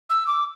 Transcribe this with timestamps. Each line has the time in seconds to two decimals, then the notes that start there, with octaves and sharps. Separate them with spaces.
0.10 E6
0.27 D6